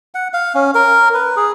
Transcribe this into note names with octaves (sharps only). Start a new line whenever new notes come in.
F#5
F5
C#4
A#4
B4
G#4